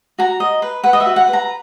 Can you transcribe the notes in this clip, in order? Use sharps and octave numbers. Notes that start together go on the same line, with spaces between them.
F#4 A#5
D#5
B4
B4 F#5
D#5
E5
F#4
F#5
B4
A#5